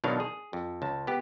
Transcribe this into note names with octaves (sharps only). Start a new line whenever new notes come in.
B1 B2 D#3 F#3 D4 F5
G#4
F2
C#2 A5
B3 G4